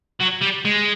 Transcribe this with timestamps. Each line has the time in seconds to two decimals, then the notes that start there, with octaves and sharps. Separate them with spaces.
0.21 F#3
0.42 G3
0.65 G#3